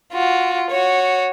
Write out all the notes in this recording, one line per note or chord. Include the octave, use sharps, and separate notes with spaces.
F4 F#4
F#4 C#5